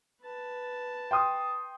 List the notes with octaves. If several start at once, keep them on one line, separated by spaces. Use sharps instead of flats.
B4 A5
G5 C6 D#6